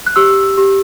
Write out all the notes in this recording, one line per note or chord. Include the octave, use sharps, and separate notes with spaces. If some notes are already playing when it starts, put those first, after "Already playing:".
F#6
G4 E6
G4